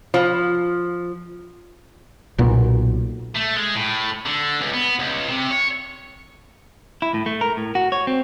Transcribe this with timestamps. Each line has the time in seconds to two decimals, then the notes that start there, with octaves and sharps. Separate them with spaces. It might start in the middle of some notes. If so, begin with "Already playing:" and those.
0.14 F3
2.38 B1 A#2 B3
3.36 A3
3.57 G#3
3.76 A2
4.26 D3
4.61 C#2
4.74 B3
4.99 C#2
5.28 C3
5.51 C#5
7.02 E4
7.14 A2
7.26 A3
7.41 A#4
7.57 A2
7.75 F#4
7.92 C#5
8.07 C4